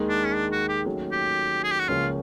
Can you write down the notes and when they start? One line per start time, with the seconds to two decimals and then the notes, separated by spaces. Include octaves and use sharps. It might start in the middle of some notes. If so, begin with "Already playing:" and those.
Already playing: D#2 D#3 G#3
0.09 D4
0.25 C#4
0.34 D4
0.52 F#4
0.69 G4
0.86 D#2 D#3 F#3 A3 C#4
1.12 G4
1.63 G#4
1.71 G4
1.80 F#4
1.89 C#2 C#3 F3 A#3 C#4 F4